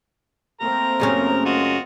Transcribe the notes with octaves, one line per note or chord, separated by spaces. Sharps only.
A3 A#3 C4 A#4 A#5
F#2 C#3 C#4
F4 F#4 D#5